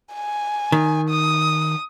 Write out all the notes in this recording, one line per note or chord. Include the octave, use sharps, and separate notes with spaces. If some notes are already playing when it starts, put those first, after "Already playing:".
G#5
D#3
D#6